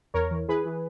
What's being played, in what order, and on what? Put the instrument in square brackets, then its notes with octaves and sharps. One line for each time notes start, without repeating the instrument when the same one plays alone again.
[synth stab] E2 A#4 C#5
E3
E3 G#4 B4
E3